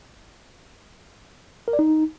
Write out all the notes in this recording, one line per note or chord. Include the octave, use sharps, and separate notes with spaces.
A#4
D5
D#4